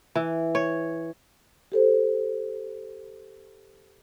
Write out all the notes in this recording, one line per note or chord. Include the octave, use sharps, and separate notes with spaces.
E3
C#5
G4 A4 C5